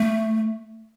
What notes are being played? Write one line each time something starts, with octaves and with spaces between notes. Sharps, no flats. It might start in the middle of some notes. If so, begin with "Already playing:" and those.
Already playing: A3